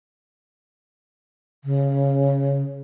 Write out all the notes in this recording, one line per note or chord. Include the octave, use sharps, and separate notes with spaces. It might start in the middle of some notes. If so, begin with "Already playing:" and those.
C#3